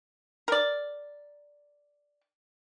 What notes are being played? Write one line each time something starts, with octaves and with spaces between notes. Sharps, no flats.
A#4 D5